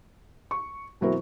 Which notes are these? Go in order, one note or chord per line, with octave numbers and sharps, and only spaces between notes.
C#6
B2 E3 F#3 C4 E4 A#4